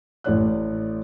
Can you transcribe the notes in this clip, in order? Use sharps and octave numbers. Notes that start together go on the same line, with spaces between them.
A1 A2 D5 F#6